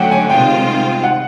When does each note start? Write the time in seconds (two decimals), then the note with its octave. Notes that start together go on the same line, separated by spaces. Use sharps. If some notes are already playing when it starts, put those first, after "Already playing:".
Already playing: D3 F#3 A3 C#4 F#5 G5
0.11 G#5
0.29 C3 D#3 G#3 C4 F4 G5
1.04 F#5